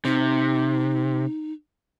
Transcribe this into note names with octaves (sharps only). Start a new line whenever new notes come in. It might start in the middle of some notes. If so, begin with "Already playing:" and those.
C3 D#4